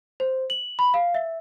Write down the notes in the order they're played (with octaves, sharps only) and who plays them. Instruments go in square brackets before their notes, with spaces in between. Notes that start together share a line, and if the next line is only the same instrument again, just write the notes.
[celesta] C5
F#7
B5
F5
E5